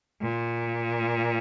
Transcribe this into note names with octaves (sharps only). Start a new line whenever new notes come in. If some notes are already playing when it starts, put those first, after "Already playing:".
A#2